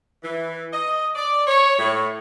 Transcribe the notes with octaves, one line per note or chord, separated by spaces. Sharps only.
E3
D#5
D5
C#5
A2